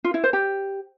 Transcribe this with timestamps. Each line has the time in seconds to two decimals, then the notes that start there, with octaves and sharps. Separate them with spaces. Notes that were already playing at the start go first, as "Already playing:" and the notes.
0.04 F4
0.14 E4
0.24 C5
0.33 G4